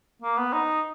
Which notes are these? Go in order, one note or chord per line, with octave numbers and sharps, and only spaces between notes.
A#3
B3
D#4